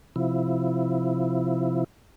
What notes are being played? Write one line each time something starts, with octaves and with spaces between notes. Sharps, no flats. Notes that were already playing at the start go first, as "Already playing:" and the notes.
C3 F3 E4